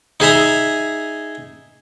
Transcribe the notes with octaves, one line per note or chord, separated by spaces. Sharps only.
D#4 G#4 E5 A#5